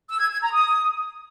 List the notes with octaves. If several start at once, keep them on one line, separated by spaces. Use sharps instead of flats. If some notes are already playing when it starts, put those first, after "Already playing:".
E6
G#6
G#6
A#5
D#6